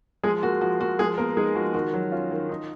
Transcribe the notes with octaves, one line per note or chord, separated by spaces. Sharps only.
F3 G#3 G#4
A#3 F#4
F3 F#4
A#3 F#4
F3 G#3 G#4
A#3 B3 A#4
G#3 D#4 G#4
F3 F#4
D#3 F#4
F#3
C#4 F4
D#3
D#4